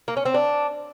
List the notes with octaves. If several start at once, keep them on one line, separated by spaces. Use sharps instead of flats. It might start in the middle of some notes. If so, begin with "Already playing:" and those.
A#3
C#4
C4
D4